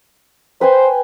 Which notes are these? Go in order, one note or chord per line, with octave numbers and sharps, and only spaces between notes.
B4 C5 G5 G#5